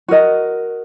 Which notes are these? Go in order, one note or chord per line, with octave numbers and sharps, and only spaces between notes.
F#4 A#4 D#5